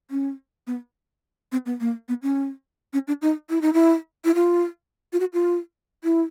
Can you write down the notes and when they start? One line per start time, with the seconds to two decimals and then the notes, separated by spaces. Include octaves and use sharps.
0.11 C#4
0.67 B3
1.52 C4
1.66 B3
1.81 A#3
2.09 B3
2.23 C#4
2.93 C#4
3.08 D4
3.22 D#4
3.50 E4
3.62 D#4
3.73 E4
4.25 E4
4.35 F4
5.13 F4
5.20 F#4
5.33 F4
6.04 E4